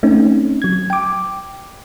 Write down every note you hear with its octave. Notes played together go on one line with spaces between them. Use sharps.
A3 C4 C#4 D#4
F#3 G#6
G5 D6